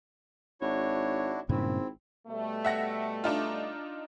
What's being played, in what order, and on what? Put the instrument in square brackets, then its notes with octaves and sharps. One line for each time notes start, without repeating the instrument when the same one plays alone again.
[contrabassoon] G#1 [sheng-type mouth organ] D4 E4 F#4 [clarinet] C#5
[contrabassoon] G#1 [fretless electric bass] G2 A#2 C#3 [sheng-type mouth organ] C4 [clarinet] E4
[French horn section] B2 G3 A3
[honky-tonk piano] E5 F#5 A#6
D4 D#4 F4